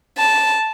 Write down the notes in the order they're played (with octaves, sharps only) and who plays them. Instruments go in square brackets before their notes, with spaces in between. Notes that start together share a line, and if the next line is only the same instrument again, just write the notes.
[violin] A5